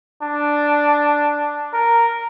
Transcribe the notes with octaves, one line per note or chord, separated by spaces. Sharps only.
D4
A#4